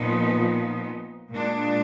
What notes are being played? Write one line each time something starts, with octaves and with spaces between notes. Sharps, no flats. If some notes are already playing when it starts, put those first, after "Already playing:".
Already playing: A#2 F3 B3 D#4
A#2 G#3 D4